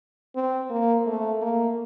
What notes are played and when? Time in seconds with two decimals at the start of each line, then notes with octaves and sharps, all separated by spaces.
0.35 C4
0.71 A#3
1.06 A3
1.42 A#3